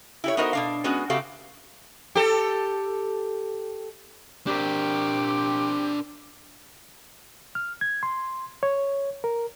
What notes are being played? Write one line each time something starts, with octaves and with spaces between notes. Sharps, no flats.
E4 G4 C#5
B3 D#4 F#4 A#4 C5 D#5
B2 D4 F5
G#3 B3 C#4 F#4
C#3 A3 C4 F#4 G4 F5
G4 A4
C4 D4 G4 A#4
F6
G#6
C6
C#5
A#4